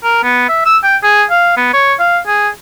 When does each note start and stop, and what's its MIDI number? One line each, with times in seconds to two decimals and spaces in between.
0.04 0.23 70
0.24 0.44 59
0.49 0.64 76
0.66 0.78 88
0.84 0.97 79
1.03 1.24 68
1.31 1.52 77
1.57 1.72 59
1.73 1.94 73
2.00 2.19 77
2.27 2.49 68